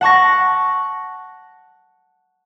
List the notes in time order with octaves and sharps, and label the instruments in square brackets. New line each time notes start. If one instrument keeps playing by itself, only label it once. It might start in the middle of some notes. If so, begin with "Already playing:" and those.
[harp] F#5 A5 C#6 A#6